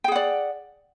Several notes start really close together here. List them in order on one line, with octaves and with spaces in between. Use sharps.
G5 G#4 F#5 D5